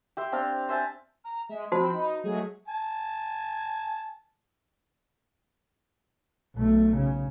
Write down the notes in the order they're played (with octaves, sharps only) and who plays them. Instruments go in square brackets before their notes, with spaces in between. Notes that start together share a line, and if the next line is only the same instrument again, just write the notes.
[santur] G4 E5 C6
C4 D4 F5
C5 E5 G#5 A5
[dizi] A#5
[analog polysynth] G#3 [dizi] E5
[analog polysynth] F3 C4 [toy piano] F#4 C5 A5 [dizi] B5
[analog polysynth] D#4
[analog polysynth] F#3 G#3 A3 [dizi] G#4
[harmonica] G#5 A5
[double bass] B1 A3
C#3